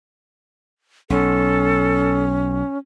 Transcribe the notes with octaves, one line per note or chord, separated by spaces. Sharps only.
B1 C#4 A4